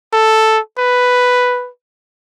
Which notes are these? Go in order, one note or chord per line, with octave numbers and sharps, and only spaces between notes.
A4
B4